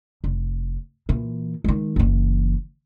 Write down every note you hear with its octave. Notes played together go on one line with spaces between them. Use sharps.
F1
A#2 E3
D#3 G#3
F#1 E3